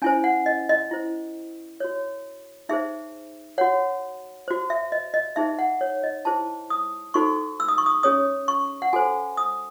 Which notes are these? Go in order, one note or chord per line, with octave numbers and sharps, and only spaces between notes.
C#4 E4 C5 G#5
F#5
D#5
D#5
E4 C5
F#4 C#5
D#4 G#4 C5 E5
F#4 C#5 F#5
F#4 C5
E5
D#5
D#5
D#4 G#4 C5 E5
F#5
C#5
D#5
E4 G#4 C5 A5
D#6
D#4 F#4 A4 C5 C#6
E6
D#6
C#6
D#6
C#4 G#4 C#5 D#6
C#6
F#5
F#4 A4 C5 G#5
D#6